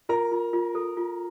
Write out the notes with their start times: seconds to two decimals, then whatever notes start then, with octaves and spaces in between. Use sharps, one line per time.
0.09 F4 A#4 A#5
0.31 F4
0.53 F4
0.75 A4
0.97 F4